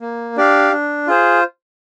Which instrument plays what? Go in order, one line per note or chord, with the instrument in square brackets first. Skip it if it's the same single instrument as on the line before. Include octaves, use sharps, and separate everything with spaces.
[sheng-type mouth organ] A#3
D4 G4 D5 F5
D4
F4 G#4 C5